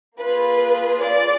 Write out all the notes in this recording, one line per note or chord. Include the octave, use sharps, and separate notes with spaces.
A#3 F4 G#4 B4
D5